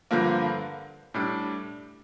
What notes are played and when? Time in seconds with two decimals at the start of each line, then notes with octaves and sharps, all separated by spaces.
0.11 G2 D3 F3 A#3
1.14 A2 G3 D4